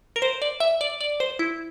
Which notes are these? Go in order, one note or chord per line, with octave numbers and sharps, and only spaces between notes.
A#4
C5
D5
E5
D5
D5
C5
E4